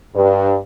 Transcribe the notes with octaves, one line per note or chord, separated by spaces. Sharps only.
G2